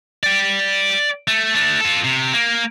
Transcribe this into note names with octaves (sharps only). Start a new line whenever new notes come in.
D5 G5
A3
A3 D4
F4 A4
C3
A#3